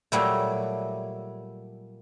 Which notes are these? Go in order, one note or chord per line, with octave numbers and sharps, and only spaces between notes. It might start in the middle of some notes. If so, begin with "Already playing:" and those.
A#2 F#3 G3 A3